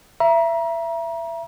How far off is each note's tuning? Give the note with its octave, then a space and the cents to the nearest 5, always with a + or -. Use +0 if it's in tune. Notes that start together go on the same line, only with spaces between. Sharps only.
E5 +25 A#5 +30